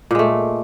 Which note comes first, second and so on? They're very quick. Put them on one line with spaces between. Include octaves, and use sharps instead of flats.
A#2 G#3 A3